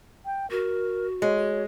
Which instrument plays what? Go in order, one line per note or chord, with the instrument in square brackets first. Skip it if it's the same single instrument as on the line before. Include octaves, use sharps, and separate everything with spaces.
[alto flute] G5
[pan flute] F#4 [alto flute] A#4
[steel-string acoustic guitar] G#3 [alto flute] C#5